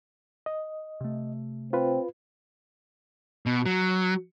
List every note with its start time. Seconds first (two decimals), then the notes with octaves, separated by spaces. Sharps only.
0.46 D#5
1.01 C3 A3
1.73 C4 F4 B4
3.46 B2
3.66 F#3